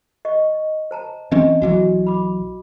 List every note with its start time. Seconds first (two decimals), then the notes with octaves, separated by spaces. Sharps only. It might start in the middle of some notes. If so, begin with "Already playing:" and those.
0.25 D#5 C#6
0.91 C5 A5 A#5
1.32 E3 C4 C#4 D#5
1.62 B1 E3 F#3 F#4
2.07 B5 D6